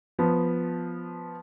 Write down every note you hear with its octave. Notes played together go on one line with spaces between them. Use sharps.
F3 B3